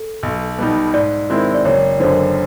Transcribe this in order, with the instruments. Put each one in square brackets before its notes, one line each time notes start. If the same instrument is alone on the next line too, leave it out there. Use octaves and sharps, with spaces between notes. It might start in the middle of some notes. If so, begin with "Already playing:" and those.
Already playing: [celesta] A4
[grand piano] B1
B2 G3 B3 D#4
[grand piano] G#2 [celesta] D5
[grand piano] D#3 G#3 C4 E4
[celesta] D5
[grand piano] F#1 [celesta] C#5
[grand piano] F#2 D3 [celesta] C5